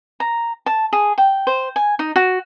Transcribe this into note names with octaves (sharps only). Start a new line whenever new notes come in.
A#5
A5
G#4
G5
C5
G#5
D#4
F#4